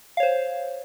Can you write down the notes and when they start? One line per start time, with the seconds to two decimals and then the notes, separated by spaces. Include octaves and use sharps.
0.17 F5
0.20 C#5
0.23 C5